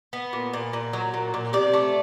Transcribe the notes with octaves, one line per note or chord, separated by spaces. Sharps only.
B3
A#2
A#2
A#2
F#3
A#2
A#2
C3 D5
A3